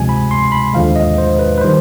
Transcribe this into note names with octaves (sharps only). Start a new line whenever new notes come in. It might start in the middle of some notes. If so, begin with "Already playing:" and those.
Already playing: D2 C3 F3 G#3 G#5
B5
C6
B5
D#2 D3 F3 G#3 F5
D#5
C5
B4
B4
D#3 G3 C5